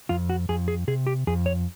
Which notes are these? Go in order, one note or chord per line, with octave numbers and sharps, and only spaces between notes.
F2 F4
F#4
F2 G#4
G#4
C3 G#4
G4
F2 G#4
C#5